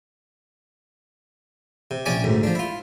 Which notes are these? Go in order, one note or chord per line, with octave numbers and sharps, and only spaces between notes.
C3
A#1 C3 C#4 D5 G#5 D6
D2 G#2
F3 D4
E4 F4